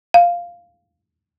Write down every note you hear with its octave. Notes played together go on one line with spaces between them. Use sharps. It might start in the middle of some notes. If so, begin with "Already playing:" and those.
F5